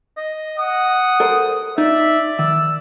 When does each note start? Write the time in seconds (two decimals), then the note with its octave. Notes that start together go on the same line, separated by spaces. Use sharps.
0.17 D#5
0.58 F#5 D#6
1.20 A4 A#4 C5
1.78 D#4 D5 E5
2.39 D#3 E6